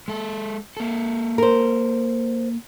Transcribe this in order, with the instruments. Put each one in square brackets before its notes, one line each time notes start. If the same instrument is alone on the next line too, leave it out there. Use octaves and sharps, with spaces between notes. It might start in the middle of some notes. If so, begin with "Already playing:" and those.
[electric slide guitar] G#3 A4
A#3 A4
[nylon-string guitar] A#4 C5